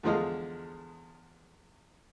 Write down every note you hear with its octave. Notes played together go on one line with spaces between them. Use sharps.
E2 D3 F3 G#3 D#5 F5